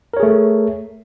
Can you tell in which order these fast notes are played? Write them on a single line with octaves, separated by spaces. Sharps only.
A#4 C#5 G#4 A3